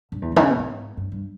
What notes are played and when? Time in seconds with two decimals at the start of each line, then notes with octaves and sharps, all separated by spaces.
0.12 G2
0.22 E2
0.32 G2
0.36 D#3
0.41 C#3
0.50 B2
0.59 G#2
0.97 G2
1.12 G2